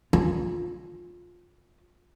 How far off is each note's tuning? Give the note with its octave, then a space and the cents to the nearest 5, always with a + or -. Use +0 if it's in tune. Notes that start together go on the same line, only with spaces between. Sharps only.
F4 +15